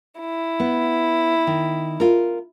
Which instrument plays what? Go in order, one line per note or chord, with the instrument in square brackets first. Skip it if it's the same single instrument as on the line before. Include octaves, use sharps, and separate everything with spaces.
[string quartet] E4
[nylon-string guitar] B3
D#3
F4 A#4